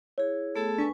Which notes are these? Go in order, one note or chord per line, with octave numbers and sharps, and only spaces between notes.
E4 G#4 C#5
A3 B3 G#4 A4
D4 B4 G#5 C#6